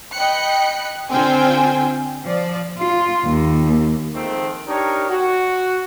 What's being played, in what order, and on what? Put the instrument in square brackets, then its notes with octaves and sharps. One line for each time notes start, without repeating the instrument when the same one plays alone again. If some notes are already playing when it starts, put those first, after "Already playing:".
[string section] D#5 G5 B5 F#6 C#7
D3 C4 F4 C5 G5 G#5
F3 D5
[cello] F4
D#2
[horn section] D#3 F3 G#3 A3 C4
D4 D#4 G4 A#4 C#5
F#4